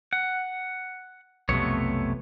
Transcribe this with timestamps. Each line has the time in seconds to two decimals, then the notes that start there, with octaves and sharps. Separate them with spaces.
0.13 F#5
1.49 B1 F2 C3 A3 B3 C#5